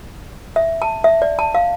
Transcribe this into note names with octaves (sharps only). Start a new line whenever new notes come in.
E5
A5
E5
D5
A5
F5